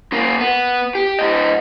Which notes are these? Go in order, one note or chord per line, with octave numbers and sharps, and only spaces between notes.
C#3 A#3
B3
G4
A2 D#5